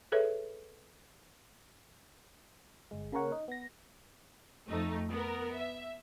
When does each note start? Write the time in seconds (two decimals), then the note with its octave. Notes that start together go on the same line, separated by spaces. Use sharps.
0.12 G#4 A4 B4 C#5 E5
2.91 G1 G#3
3.12 C#3 A#3 C#4 A#4 C#5 F#5
3.32 D#4
3.48 B3 A#6
4.68 F2 A3 D#4
5.10 B3 A#4
5.55 E5